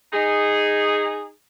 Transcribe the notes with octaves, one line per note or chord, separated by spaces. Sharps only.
D#4 G#4